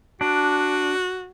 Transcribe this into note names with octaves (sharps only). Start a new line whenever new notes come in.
D4 F#4